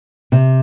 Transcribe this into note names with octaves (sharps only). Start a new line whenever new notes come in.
C3